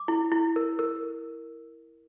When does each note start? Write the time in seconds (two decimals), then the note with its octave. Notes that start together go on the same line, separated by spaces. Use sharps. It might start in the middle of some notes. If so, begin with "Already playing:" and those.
Already playing: D6
0.08 E4
0.32 E4
0.56 A#4
0.79 A#4